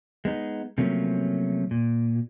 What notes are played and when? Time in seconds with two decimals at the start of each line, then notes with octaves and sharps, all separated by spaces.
0.25 G#3 B3 D#4
0.78 C3 F3 F#3 A3 A#3 C#4
1.71 A#2